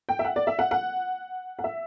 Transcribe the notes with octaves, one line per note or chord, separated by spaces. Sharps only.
G5
E5
F#5
D5
E5
F#5
F#5
F#5
E5